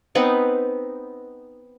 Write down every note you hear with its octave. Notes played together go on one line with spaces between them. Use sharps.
B3 C4 D#4 B4